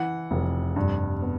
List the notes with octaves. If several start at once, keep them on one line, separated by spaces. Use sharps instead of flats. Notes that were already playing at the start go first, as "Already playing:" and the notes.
Already playing: E3 F#5
F1
G2
B3